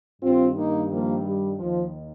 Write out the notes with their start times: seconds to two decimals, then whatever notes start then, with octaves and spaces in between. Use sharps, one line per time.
0.22 G2 D#3 C4 F4
0.56 A#3 D#4
0.90 F3 A#3
1.25 G3
1.58 D#2 D#3 F3